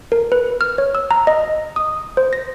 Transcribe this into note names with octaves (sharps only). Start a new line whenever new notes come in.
A#4
B4
F6
C#5
E6
A#5
D#5
D#6
C5
A#6